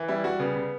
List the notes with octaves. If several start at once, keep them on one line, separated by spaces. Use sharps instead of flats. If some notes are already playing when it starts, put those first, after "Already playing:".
Already playing: E3
G3 E4
G3 F#4
C#3 B3
C#3